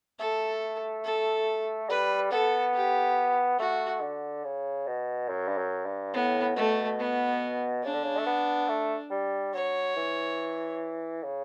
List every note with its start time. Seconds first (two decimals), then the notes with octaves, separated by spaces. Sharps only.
0.19 A3 A4
1.05 A4
1.90 G3 B4
2.31 B3 A4
2.74 G4
3.59 A3 F#4
4.01 D3
4.44 C#3
4.87 B2
5.29 F#2
5.48 G2
5.57 F#2
5.86 G2
6.14 A2 B3
6.56 B2 A3
6.99 B3
7.84 C#3 D4
7.94 D3
8.04 C#3
8.18 A3
8.26 B3
8.69 A3
9.11 G3
9.54 F#3 C#5
9.96 E3
11.24 C#3